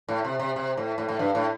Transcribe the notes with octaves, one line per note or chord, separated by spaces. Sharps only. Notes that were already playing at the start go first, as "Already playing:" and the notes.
A2
C3
C3
C3
A2
A2
A2
G2
A2